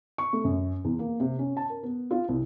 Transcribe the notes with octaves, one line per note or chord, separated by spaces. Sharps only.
C#6
A3
F#2
E2
A#3
C3
C#4
A5
A#4
B3
F4
C2